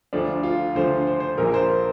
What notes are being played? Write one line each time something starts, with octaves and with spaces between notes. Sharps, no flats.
D2 D3 F3 D4
F4
D2 D3 F3 C5
C5
C5
A#1 A#2 F3 A#4
C5
A#4